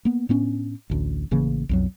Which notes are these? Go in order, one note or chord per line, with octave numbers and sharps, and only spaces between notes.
A#3 B3
A2 B3 C#4 D4
A1 D2
A1 C#3 E3 A#3
B1 F2 F#3